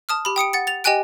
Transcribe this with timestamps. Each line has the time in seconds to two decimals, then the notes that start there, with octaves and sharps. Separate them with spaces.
0.09 A5 D#6 F6
0.25 G4 B5
0.36 G5 D#6 C#7 D7
0.53 F#5 A6 C#7
0.67 A6 F7
0.84 G4 D#5 G5 G#5 F#6 D7